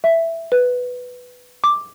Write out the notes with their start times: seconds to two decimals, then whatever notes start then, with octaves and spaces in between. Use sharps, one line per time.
0.04 E5
0.52 B4
1.64 D6